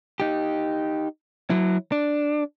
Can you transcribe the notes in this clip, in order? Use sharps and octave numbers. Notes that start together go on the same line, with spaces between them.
D#4 G4
F#3 E4
D4